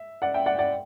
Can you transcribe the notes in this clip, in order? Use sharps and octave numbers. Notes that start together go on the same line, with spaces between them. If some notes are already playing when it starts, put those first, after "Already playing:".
Already playing: E5
D5 F#5
E5 G5
D5 F#5
D5 F#5